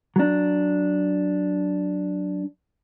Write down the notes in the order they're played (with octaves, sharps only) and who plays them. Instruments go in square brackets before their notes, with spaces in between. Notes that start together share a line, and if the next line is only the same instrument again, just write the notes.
[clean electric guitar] F#3 D4